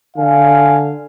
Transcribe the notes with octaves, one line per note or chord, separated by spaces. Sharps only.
D3 F5 G#5